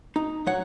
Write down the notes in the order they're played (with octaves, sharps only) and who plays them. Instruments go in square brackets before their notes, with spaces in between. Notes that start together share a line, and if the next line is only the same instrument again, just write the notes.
[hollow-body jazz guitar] D#4
F#3 C#5 F#5